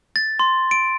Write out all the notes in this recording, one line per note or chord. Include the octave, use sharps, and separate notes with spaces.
A6
C6
D7